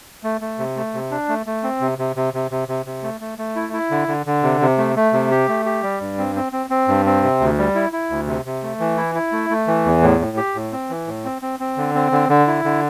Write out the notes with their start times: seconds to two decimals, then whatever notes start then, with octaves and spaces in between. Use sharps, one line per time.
0.24 A3
0.41 A3
0.59 C3
0.76 A3
0.94 C3
1.11 D4
1.29 A3
1.46 A3
1.63 C4
1.81 C3
1.98 C3
2.16 C3
2.34 C3
2.51 C3
2.68 C3
2.86 C3
3.03 A3
3.21 A3
3.38 A3
3.56 E4
3.73 E4
3.91 D3
4.08 D3
4.26 D3
4.43 C3
4.61 C3
4.78 A3
4.96 A3
5.13 C3
5.31 G4
5.48 A3
5.65 G4
5.83 G3
6.00 G2
6.18 C4
6.36 C4
6.53 C4
6.70 C4
6.88 G2
7.06 C4
7.23 C3
7.40 D2
7.58 G3
7.75 E4
7.93 E4
8.10 D2
8.27 C3
8.45 C3
8.63 A3
8.80 E3
8.97 E4
9.15 E4
9.32 A3
9.50 A3
9.67 E3
9.85 E2
10.02 A2
10.20 A2
10.37 G4
10.55 A2
10.72 C4
10.90 E3
11.07 A2
11.25 C4
11.42 C4
11.60 C4
11.77 D3
11.95 C4
12.12 D3
12.29 D3
12.47 E4
12.65 D3